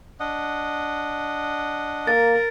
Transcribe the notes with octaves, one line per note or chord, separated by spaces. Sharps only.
D4 D#5 F#5
A#3 A#4 A6